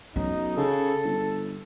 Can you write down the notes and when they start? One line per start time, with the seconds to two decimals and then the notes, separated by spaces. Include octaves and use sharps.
0.16 B1 C#4 D#4
0.57 C#3 A4
1.04 G1